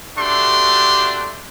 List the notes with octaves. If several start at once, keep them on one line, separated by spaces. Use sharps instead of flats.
A3 D4 F#4 G4 A4 C6